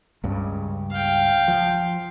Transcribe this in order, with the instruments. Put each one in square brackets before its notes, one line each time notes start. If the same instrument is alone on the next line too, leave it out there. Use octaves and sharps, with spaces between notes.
[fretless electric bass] C#2 G2 C#3
[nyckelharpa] F5 G5
[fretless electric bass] F3